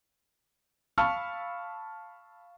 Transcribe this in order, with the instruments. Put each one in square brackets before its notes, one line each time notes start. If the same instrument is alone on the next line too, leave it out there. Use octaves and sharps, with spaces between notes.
[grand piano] F5 A5 B5 C#6 E6 F6